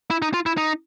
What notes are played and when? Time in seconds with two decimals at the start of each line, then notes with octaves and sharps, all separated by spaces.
0.10 E4
0.22 D#4
0.34 F4
0.46 E4
0.57 D#4